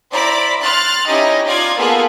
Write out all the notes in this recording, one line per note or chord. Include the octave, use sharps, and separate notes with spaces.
E4 C5 D5 A#5 B5 D6
C6 F6 F#6 A6
C#4 D#4 E4 G4 D#5
D#4 F4 D5 G#6
A#3 B3 F4 G#4 A4 B4